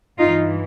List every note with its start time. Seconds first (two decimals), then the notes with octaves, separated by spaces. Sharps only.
0.18 G2 E3 D#4 F4